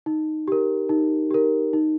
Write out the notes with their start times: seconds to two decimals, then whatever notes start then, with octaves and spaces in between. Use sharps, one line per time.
0.06 D#4
0.48 G4 A#4
0.89 D#4
1.31 G4 A#4
1.73 D#4